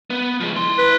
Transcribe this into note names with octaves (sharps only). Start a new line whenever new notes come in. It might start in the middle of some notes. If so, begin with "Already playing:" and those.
B3
F3 G#3
E4 C6
B4